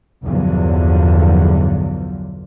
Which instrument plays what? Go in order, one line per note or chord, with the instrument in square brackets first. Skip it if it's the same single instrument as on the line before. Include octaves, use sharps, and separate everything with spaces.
[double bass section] B1 E2 G2 D3 F3 F#3